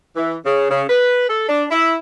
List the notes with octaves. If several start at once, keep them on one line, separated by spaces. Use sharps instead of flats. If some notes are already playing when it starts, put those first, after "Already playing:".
E3
C#3
C#3
B4
A4
D4
E4